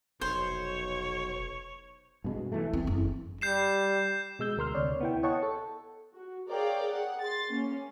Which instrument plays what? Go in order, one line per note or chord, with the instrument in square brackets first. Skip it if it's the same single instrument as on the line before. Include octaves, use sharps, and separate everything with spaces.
[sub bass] F1 [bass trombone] B1 [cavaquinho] C5 [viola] C#5
[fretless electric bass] G2 B2 G#3
B1 E3 A3
[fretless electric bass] E2 [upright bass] C4
[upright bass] F#1
[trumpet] G3 [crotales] G6 C7 E7
[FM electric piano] B2 G#3 E6 G6
D2 A#4 C6 F6
D2 C3 C#5 D5
B3 E4 G5
C#5 D#5 F#5 G5 A5 C#6
A4
[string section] F#4
G#4 A#4 C#5 D5 F5 G5
G#4 F#5
C6 A6
A#3 C#4